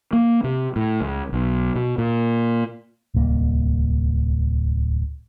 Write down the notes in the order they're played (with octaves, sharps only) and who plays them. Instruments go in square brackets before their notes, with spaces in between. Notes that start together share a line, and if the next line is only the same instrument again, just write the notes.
[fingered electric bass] A#3
C3
A2
C#2
B1
B2
A#2
[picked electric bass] D1 C2 A#3